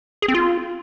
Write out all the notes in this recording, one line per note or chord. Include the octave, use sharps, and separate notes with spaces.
G#4
C4
F4